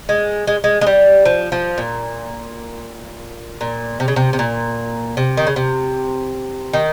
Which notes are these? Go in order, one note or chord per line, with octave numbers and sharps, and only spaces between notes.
G#3
G#3
G#3
G#3
G3
F3
F3
A#2
A#2
C3
C#3
C3
C3
A#2
C3
D#3
C#3
C3
D#3